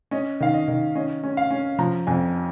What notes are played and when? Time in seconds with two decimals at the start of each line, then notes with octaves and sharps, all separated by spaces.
0.11 C#4 D#5
0.40 D#3 F5
0.54 D#5
0.68 D#3
0.95 C#4 D#5
1.24 C#4
1.37 F5
1.51 C#4
1.79 F3 A#5
2.07 F2 G#5